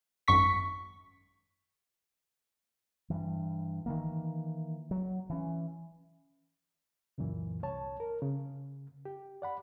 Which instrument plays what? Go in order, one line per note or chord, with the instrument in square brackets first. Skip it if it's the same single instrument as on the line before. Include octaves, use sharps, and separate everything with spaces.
[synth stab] G#1 F#2 C#6 B6
[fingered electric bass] G2 E3
D#3 E3 A#3
F#3
E3 C#4
[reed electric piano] C#2 F#2 A#2 E3
C2 C#5 A5
A#4
C#3
G4
D5 F#5 B5